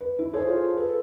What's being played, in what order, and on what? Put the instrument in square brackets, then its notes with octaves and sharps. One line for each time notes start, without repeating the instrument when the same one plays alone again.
[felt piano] B4
E4
[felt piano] G#4 A4 C5 [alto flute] C#5
[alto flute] F4
[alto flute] A4 [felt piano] B4